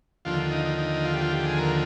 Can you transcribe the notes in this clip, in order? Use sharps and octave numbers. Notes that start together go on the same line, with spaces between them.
D#2 D3 F3 F4
D#4
D#4
D#4
F4
G4
F4
G4
G#4
A#4